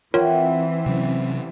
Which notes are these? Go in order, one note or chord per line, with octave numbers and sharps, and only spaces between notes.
E3 C4 F4 A#4 C#5 E5 F#5 G5
C3 F#3 C#4